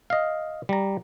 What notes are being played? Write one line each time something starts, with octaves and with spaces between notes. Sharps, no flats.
D#5 F5
G3 A#5